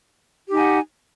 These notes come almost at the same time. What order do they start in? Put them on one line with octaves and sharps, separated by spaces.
G4 D#4 G#5 F#5